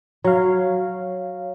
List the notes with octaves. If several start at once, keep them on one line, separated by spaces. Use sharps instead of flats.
F#3 C#5 F5